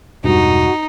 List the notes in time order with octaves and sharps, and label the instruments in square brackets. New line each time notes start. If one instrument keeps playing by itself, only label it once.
[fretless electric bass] E1 [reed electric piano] G2 [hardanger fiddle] D#4 [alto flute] F#4